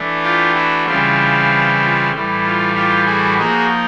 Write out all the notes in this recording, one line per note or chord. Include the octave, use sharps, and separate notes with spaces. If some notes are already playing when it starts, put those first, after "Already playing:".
Already playing: E3 A3 D4
F4 G4
E4 F#4
C#3 E3 G3 C4 E4 F4
F4
A2 E3 G3
F4
F4 G4
F#4 G#4
F3 A#3 D#4 F#4 G#4